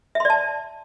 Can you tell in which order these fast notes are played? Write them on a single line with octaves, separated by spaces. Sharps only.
E5 C6 D5 A5